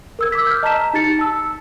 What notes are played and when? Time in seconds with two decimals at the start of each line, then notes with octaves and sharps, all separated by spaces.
0.19 A#4 E6 G#6
0.32 D6 E6 B6
0.47 F6 G6
0.63 D#5 A5 A#5 B6 E7
0.94 D#4 G4 A6 C#7
1.19 A5 E6